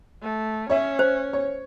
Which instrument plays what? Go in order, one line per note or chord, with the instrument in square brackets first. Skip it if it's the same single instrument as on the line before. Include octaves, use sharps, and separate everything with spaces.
[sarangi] A3
[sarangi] C#4 [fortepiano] C#5 E5
[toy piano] C5
[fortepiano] C#5